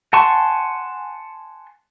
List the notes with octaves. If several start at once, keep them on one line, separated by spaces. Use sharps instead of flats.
F#5 G#5 A5 C6 C#6